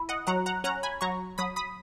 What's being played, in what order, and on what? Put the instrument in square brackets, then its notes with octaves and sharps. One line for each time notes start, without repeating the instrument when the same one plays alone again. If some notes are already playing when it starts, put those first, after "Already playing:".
Already playing: [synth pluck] E4
D#5 F#5
F#3 F#5 A#5
F#5 A#5
C#4 F#5 A#5
G#5 B5
F#3 A#5 C#6
F#3 B5 D#6
B5 D#6